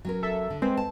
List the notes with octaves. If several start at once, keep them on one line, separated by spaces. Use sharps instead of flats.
F#3 C#4 A#4
A4 E5
D3
G#3 A#3 C4 B4
A5